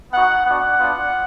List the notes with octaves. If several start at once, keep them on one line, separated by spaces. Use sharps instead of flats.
B3 D#4 F#4 F#5
B3 D4 F#4 F#5
B3 D4 F4